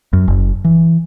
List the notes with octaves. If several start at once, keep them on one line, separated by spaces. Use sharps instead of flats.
F#2
F#1
E3